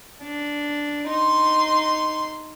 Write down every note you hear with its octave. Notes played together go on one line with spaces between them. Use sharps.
D4
D#4 C6